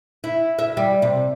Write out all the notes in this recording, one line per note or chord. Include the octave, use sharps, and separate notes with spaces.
E4
E5
G3
C3